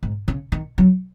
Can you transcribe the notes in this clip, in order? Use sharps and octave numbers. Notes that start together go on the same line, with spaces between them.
G#2
C#3
D#3
F#3